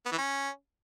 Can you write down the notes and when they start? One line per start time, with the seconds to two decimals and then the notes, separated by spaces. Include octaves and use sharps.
0.06 B3
0.12 E3
0.18 C#4